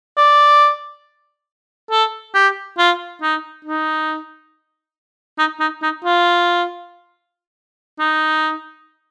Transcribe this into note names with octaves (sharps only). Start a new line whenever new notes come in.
D5
A4
G4
F4
D#4
D#4
D#4
D#4
D#4
F4
D#4